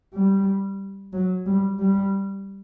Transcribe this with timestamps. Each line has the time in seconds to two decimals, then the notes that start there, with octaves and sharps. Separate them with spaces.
0.14 G3
1.12 F#3
1.46 G3
1.79 G3